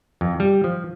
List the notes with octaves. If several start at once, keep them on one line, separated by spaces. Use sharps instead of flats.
F2
G3
F3